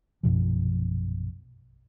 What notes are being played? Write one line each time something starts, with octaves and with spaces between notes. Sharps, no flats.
A#1 F#2 B2 F3